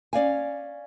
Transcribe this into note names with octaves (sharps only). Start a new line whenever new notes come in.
C#4 D5 F5 G#5